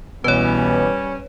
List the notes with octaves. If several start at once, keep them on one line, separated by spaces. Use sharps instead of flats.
C2 B2 E3 G3 B3 C#4 B4 C#5